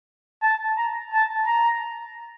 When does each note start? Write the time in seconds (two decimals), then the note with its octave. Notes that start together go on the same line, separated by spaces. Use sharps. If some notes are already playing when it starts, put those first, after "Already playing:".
0.43 A5
0.78 A#5
1.13 A5
1.47 A#5